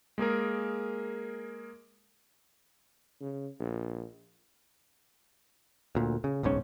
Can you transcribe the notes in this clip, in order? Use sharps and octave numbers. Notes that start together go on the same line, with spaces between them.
G#3 A#3 G#4 A#4
C#3
A#1
D2 A#2
C#3
D1 B1 G#2 C#4